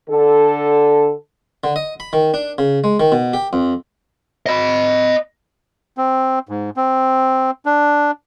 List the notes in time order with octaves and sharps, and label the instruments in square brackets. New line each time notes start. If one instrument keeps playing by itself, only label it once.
[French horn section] D3 A4
[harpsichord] D3
D#5
B5
D#3
D4
C#3
G#3
D#3
B2
G4
F2
[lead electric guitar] D#5 B5
[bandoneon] C4
G#2
C4
D4